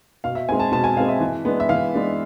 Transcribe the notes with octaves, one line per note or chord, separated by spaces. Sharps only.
B2 F5
E5
G#3 C4 G#5
A5
B2 A5
G#5
G#3 C4 F5
E5
E3
G#3 B3 D4
E5
E3 F5
G#3 B3 D4